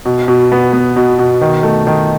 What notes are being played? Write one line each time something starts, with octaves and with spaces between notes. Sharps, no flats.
B2
B2
B3
B3
B2
B2
D#3
A3
D#3